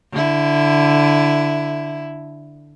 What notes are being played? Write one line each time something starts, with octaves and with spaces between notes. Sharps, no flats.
D3 E4